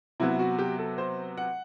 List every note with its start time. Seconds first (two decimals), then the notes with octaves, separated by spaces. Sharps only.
0.20 C3 F#3 B3 E4
0.39 F#4
0.59 G4
0.79 A4
0.98 C5
1.37 F#5